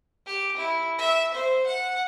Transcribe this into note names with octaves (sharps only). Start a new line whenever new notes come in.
G4
E4
E5
C5
F#5